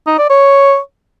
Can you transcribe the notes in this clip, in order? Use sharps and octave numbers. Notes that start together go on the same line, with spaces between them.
D#4
D5
C#5